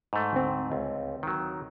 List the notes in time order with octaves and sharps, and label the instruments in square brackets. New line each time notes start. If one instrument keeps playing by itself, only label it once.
[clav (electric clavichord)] G#2 A3
[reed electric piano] D2 C4
[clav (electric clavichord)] C#2
D#3 F#3